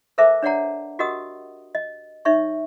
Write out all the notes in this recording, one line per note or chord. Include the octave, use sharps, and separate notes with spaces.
A4 A#4 C5 E5 A5 D6
D4 C#5 D5 F#5 A#5
F#4 G4 A#4 D#5 F#5 D#6
D#5
D#4 C#5 E5 C#6